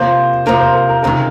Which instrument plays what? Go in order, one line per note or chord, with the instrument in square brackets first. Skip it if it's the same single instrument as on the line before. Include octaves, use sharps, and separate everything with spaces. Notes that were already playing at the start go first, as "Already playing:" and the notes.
Already playing: [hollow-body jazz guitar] C3 F3 A#3 F4 [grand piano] C5
[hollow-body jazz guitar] C3 F3 A#3 F4 [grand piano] A#4
[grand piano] C5
A#4
A#4
[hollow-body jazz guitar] C#2 C3 D#3 [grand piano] A#4